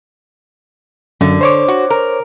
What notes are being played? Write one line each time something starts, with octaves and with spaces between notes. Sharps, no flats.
F#2 D3
C5 C#5 D6
F#4
A#4